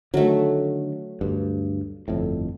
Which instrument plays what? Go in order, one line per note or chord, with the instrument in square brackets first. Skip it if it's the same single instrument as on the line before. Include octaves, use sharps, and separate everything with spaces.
[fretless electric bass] D3 D#3 [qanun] F#3 A3
[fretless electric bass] D2 G2
G1 F2 A2